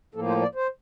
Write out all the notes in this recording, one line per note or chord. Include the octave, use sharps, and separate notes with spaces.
A2 F3 A#3 A4
C5
D5
C5